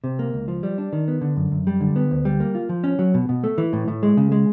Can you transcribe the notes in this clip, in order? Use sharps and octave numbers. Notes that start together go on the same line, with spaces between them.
C3
A#3
C#2
F3
G3
D4
D#3
B3
D3
F#2
F#2
G3
D3
B3
D2
G3
A#3
F4
F3
C#4
F#3
B2
B2
A3
E3
A2
A2
G#3
C#3
G#3